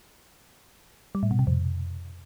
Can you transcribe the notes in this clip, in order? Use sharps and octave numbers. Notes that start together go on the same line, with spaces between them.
G3
A2
B2
C3
F2